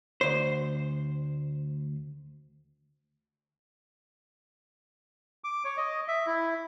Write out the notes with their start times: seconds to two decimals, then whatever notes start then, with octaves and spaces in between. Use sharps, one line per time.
0.21 D2 C5
5.44 D6
5.65 C#5
5.77 D#5
6.08 E5
6.27 E4